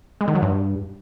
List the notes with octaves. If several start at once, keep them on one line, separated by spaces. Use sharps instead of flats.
G#3
D#3
F#3
G2